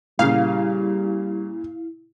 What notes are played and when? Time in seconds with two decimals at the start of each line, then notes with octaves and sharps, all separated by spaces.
0.19 A#2 C#3 G3 E4 F5